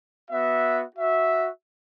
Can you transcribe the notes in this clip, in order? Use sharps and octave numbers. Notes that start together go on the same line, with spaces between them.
B3 F#4 E5
F#4 E5